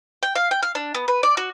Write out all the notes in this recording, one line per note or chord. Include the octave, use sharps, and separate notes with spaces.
G5
F5
G5
F5
D4
B3
B4
D5
F#4